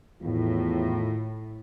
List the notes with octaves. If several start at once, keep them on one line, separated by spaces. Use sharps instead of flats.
E2 A2 D#3 F4